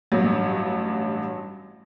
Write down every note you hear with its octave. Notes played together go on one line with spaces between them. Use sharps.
A1 G2 F#3